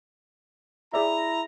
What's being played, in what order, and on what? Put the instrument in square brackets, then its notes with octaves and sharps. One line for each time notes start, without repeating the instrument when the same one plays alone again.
[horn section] E4 A#5 [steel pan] G#4 D5 E5